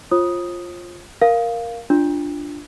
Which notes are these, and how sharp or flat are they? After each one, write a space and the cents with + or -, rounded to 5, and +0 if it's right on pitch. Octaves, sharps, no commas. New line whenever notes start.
F4 +0 C5 +45 D#6 +0
A#4 +0 F5 +0
D4 +0 F4 -10